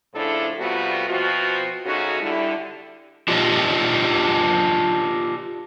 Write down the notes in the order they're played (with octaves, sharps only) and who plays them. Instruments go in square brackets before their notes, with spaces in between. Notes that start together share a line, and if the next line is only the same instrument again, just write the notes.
[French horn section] A2 C#3 F3 D4 E4 A4
C3 G3 A3 B3 F4 F#4
B2 F3 C4 F4 F#4
C#3 A3 C#4 D#4 F#4
D3 G3 E4
[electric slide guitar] D4 F4 G4 D5 D#5